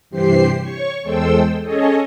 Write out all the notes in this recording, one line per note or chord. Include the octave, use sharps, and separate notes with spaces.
G2 C3 E3 G4 C5 C7
C#5 C#6
E2 G#3 A4 C5 G5 E6
C#4 G#4 A4 C#5 D#5